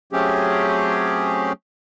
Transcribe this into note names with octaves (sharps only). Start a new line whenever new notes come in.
F#3 A3 C4 C#4 G4 G#4